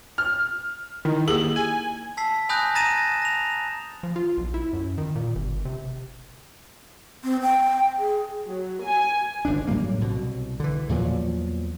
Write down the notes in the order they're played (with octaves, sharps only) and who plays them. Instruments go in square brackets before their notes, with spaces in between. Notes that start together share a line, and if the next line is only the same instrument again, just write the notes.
[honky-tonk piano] F6
[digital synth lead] D#3 [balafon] E4
[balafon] A#3 G4 G#4 [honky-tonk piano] F#7
[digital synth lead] G#5
[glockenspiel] A5 E6 B6 C7
G#5 B5 D#6 F#6 G6 A#6
A#5 D#6 A6 A#6 D#7 E7
A#6 F7
[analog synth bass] F3
F4
B1
E4
F#2
D#3
A#2
G1
C3
[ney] C4
G5
G#4
[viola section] F#3
G#5
[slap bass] G1 F2 D4
A2 F#3 G3 A#3
C2 B2
D3 E3
E2 A#2 F3 F#3